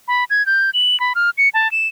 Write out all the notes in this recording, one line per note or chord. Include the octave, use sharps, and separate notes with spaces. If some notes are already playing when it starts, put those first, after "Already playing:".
B5
G#6
G6
F#7
B5
F6
C#7
A5
E7